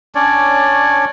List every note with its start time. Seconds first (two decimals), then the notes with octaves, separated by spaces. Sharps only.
0.15 C#4 D4 C#5 D5